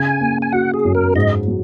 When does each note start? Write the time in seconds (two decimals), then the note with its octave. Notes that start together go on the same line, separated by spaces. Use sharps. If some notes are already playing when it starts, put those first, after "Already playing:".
Already playing: C#3 G#5
0.20 A#3
0.42 G#5
0.52 F#4 F#5
0.74 G#4
0.85 F#2
0.95 A#4
1.15 G#2 D#5
1.48 F#3